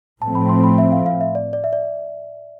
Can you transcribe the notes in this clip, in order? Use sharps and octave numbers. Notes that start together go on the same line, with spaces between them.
A2 F3 A3 C4 A5
B5
C6
B5
E5
F5
F5
E5
D5
D5
E5
D5